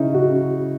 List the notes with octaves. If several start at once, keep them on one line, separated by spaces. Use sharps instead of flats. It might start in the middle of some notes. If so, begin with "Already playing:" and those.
Already playing: C#3 C#4 D#4 E4
C#3 F#4